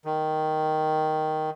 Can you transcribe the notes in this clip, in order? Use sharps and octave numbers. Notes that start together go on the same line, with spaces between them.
D#3